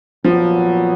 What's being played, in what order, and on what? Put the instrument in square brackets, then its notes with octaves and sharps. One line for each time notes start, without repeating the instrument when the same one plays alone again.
[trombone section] A#2 F#3 B3 [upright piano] F3